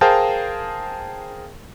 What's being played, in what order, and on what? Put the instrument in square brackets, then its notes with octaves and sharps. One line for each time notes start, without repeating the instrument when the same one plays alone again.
[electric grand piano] G#4 A#4 C5 F5 G5 A5